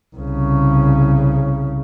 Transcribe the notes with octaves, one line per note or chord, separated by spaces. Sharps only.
C2 C#3